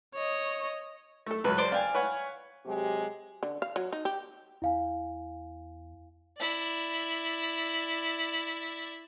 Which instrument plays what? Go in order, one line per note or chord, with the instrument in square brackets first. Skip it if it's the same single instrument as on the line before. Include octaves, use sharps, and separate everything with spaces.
[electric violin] C#5 D#5
[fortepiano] A3 A4
[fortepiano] C#2 F#2 [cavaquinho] B4
[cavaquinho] C5 D5 C6
[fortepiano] D5 G5 [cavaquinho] F5 G#5
[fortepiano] B4 C#5 F#5
[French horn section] C3 F#3 G#3 G4
[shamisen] D3
F5
F#3
D#4
G4
[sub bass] E2 [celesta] E4 F5 G#5
[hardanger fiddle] E4 D5